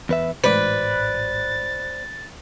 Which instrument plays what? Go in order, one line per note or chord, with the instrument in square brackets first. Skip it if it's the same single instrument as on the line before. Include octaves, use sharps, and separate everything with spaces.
[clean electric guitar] E2 B4 E5
[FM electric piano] A1 G#2 F#4 [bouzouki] B4 [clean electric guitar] C5 D5 [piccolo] A6